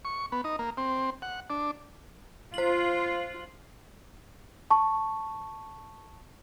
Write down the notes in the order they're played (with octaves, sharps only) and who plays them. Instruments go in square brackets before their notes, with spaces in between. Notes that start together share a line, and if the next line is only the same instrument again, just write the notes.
[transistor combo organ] C#6
B3
D#4
A#3
C4
F#5
D4
[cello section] F4 [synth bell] C5 F#7
[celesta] A5 C#6